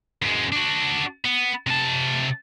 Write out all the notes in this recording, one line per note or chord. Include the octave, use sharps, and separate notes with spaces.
F#2 G#3
D4 F#4
B3
C3 A5